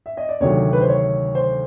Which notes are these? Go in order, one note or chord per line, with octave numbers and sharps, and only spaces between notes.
E5
D#5
D5
D2 C3 D#3 F#3 C#5
B4
C5
C#5
C5